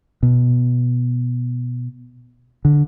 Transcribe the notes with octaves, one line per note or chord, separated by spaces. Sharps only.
B2
D3